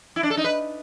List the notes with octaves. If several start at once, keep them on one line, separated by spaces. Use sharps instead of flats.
E4
D4
A4
D#4
B4